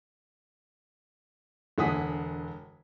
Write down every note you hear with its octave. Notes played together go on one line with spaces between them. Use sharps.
E1 D3 F#5 G#5 D#6 B6